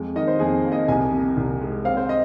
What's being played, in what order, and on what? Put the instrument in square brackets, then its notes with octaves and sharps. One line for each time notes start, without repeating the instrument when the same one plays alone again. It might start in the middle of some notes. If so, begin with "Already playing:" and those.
Already playing: [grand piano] F2 G#3
D#3 D#5
C5
F2 G#4
A#3
D#5
C2 G#5
C3
C2
G#3
C4 F5
C5
D#5